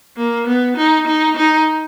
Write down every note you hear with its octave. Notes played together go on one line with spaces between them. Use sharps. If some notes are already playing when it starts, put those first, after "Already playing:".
A#3
B3
D#4
D#4
D#4